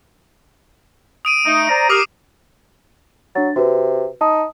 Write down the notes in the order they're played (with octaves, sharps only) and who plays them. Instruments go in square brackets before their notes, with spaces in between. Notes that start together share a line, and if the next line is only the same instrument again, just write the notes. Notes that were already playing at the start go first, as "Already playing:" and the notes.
[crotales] D#6 D7 D#7
[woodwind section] A3 D#4
C5 D5 A#5
[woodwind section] G4 A#4 [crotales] D6 D#6 C7
[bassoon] F#3 [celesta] D4 A6
[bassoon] C3 [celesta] F#4 B4
[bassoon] D#4 [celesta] A5 D#6